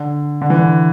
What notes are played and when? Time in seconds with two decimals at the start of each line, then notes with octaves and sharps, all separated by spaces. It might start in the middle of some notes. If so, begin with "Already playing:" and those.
Already playing: D3
0.41 D3
0.50 E3
0.57 D3